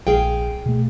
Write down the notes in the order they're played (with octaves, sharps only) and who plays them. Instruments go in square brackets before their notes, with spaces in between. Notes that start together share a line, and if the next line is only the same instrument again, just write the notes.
[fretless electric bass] A#1 [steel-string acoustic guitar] G#4 F5 G5
[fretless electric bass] B2 A3